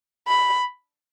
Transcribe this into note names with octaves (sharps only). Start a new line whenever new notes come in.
B5